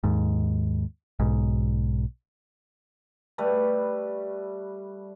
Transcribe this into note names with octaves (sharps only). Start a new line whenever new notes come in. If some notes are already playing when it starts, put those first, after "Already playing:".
D#2 G#2
B1 G#2
G3 A3 B4